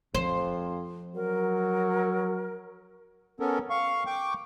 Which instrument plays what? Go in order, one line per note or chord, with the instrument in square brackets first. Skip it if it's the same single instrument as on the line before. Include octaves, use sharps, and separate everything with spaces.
[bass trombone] F2 [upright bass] F3 [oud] C5
[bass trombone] F#3 [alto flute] A#4
[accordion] B3 C#4 A4 A#4
F5 C#6
G5 C#6 D6